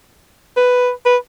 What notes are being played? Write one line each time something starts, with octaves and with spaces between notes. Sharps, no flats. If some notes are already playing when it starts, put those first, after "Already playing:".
B4
B4